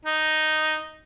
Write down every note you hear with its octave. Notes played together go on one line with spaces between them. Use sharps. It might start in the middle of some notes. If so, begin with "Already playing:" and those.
D#4